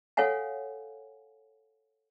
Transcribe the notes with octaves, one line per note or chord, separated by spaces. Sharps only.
A4 C#5 F5 F#5 G#5